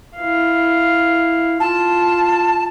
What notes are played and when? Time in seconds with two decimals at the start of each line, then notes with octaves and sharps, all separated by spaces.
0.17 E4 F5
1.60 F4 A5